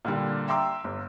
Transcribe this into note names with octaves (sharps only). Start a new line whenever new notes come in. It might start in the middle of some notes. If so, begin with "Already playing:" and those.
A#2 D3 G3
E5 G5 A#5 C6 D6 E6
G1